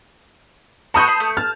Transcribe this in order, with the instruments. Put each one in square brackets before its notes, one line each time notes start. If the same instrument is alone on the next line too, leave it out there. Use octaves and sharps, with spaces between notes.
[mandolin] F#4 B5 C#6 [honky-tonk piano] A5 D#6 G6
[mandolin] B5 C6
A3
[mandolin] A5 [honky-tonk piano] F6